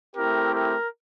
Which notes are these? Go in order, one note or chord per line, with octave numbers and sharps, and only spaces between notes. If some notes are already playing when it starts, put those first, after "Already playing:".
A3 C4 E4 G4 A#4
A#4